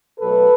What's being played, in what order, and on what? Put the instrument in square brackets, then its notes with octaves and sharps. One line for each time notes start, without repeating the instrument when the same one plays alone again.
[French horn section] B2 F#3 A3 A4 B4